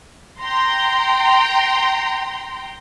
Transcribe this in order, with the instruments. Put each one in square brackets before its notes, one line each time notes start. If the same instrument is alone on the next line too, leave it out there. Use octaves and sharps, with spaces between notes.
[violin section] G5 A#5 C6